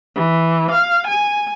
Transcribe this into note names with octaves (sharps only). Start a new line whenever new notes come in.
E3
F5
G#5